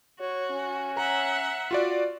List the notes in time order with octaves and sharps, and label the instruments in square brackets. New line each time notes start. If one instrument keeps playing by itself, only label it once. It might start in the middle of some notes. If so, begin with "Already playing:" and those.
[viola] F#4 [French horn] C#5
[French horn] C#4
[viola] E5 F#5 [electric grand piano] A#5
[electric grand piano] F4 F#4 D5